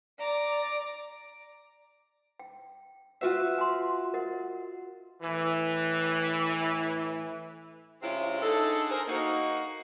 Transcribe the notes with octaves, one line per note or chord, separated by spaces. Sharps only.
D5 A#5 D6
G5
F4 F#4 B4 E5 F#5
G#5 C6
A#4 D#5 F#5
A2 E3
C3 G#3 C4 C#4 E4 F4
D3 D#4 G#4 A4
G#4 A#4 C5
A#3 D#4 F#4